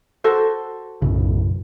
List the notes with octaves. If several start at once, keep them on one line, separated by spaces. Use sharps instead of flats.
F#4 A4 C5
B1 F#2 A2 C#3